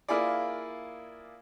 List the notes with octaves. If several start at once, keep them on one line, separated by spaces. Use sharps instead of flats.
A#3 E4 F4 G#4 D5